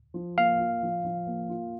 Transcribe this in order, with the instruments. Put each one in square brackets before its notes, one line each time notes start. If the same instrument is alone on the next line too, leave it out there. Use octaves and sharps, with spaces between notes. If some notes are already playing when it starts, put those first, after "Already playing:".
[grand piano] F3
[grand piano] A#3 [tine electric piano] F5
[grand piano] F4
F3
F3
A#3
F4